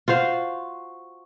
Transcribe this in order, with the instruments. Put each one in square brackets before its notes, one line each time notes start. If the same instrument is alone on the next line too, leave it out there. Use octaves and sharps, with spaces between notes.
[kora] F4 F#4 C5 F5